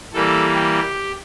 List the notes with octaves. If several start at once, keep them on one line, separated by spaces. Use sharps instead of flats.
E3 G3 A#3 A4
G4